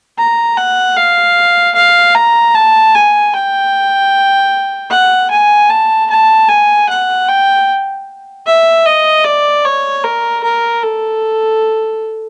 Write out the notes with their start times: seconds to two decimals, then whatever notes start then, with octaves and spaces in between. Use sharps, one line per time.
0.19 A#5
0.57 F#5
0.97 F5
1.75 F5
2.15 A#5
2.55 A5
2.95 G#5
3.34 G5
4.91 F#5
5.31 G#5
5.70 A5
6.10 A5
6.48 G#5
6.89 F#5
7.28 G5
8.46 E5
8.86 D#5
9.24 D5
9.65 C#5
10.04 A#4
10.43 A#4
10.83 A4